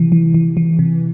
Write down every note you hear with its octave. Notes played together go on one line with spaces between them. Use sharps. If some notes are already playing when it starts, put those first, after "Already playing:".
Already playing: C3 E3
E3
E3
E3
C3